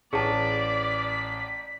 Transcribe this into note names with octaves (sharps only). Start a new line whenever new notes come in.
A1 G#4 D5 A5 B6